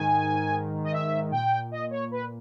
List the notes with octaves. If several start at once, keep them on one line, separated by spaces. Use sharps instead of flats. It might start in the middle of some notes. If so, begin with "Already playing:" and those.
Already playing: G#2 D#3 G#5
D#5
E5
A#2 G5
D#5
C#5
B4